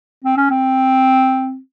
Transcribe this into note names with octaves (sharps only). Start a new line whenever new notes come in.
C4
C#4
C4